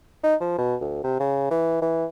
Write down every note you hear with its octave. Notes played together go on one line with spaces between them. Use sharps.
D#4
F3
B2
D2
C3
C#3
E3
E3